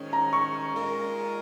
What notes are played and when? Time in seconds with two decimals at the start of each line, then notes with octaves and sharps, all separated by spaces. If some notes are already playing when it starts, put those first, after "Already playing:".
Already playing: G#2 D#3 C#4
0.13 A#5
0.33 C#6
0.73 A#2 G#3 F4 A#4